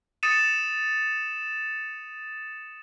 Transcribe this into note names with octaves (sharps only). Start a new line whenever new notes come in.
D#6 A6 C#7 D#7 E7